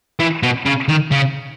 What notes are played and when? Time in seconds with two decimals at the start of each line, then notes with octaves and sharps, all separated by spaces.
0.20 E3
0.43 B2
0.66 C#3
0.89 D#3
1.11 C#3